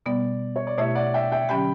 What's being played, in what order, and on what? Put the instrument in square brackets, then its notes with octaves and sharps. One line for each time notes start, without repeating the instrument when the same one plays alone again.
[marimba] B2 G3 B3 [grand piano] D5
[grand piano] C#5
D5
[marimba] B2 A3 E4 G4 [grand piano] C#5 E5
[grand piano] D5 F#5
E5 G5
E5 G5
[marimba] D3 F#3 C#4 G4 [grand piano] G5 B5